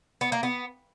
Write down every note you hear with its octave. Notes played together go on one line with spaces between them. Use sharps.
B3
A#3
B3